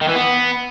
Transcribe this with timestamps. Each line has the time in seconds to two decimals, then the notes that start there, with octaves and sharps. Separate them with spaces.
0.02 D#3
0.09 E3
0.16 B3